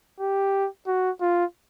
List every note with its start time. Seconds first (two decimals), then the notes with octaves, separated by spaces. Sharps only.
0.20 G4
0.87 F#4
1.21 F4